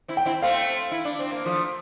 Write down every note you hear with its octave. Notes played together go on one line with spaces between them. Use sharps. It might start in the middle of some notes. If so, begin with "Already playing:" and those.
C4 E4
G5
C4 E4
A3 C4 F5
E4
D4
C4
A#3
F3 A3